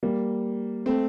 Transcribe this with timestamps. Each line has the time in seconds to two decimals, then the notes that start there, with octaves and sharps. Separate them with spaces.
0.03 G3 A#3
0.86 A3 C4